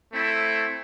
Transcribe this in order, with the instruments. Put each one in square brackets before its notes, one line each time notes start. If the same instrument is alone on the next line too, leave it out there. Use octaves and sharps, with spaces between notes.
[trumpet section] A3 C4 E4